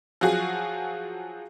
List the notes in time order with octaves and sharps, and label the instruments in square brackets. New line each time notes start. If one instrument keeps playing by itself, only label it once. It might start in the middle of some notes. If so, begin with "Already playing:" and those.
[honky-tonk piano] F3 F#3 F#4 G#4